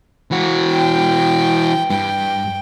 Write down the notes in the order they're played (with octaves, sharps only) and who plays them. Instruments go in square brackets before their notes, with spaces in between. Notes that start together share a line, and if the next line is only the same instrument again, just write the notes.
[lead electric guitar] E3 F#4
[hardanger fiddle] G5
[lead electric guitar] G2 [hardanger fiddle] G5